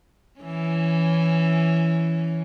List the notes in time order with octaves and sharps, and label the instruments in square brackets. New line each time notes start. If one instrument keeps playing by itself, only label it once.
[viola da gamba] E3 C#4